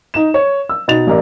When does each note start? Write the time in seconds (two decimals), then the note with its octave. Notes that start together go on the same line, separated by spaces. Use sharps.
0.14 D#4 E7
0.34 C#5
0.69 E6
0.88 B2 D#4 A6 F7
1.07 A1 A#4 D5